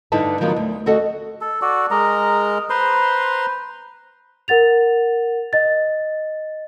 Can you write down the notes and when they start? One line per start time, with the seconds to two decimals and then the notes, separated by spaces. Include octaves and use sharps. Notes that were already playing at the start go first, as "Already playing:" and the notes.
0.12 G2 D3 D#4 E4 B4 A5
0.41 D#3 F3 F#3 B3
0.56 D2
0.86 D2 F#4 A4 D#5 F#5
1.41 A4
1.62 F#4 A4 D5
1.91 G#3 A#4 D#5 A#5
2.70 B4 C5 A#5 C6
4.48 A#4 F#5 A6 F7
5.53 D#5 A6